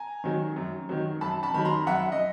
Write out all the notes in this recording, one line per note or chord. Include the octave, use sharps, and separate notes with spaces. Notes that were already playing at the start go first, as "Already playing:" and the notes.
Already playing: G#5 A#5
D#3 F#3
F#2
D#3 F#3
F#2 A5 B5
A5 B5
D#3 F#3 B5
A#5 C6
F#2 E5 F#5
D#5